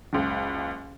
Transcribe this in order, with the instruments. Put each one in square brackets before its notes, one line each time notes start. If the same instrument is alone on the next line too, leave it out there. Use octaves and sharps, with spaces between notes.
[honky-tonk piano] F#1 C#2